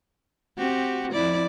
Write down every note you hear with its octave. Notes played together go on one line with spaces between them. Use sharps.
C4 F#4 G4
F2 E4 D5